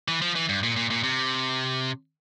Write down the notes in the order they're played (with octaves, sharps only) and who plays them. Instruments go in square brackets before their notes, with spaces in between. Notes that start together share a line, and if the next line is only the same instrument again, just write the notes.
[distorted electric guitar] E3
F3
E3
G2
A#2
A#2
A#2
C3